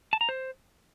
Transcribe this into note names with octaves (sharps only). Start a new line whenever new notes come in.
A5
A#5
C5